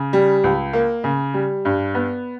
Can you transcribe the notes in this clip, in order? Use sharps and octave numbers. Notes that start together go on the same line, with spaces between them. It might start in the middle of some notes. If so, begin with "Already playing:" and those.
Already playing: C#3
G3
C#2
A#3
C#3
G3
G2
B3